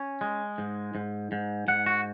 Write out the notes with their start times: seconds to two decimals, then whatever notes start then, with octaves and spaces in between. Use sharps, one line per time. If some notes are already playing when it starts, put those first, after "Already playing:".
Already playing: C#4
0.21 G#3
0.58 G#2
0.95 G#2
1.32 G#2
1.68 G#2 F#5
1.86 F#4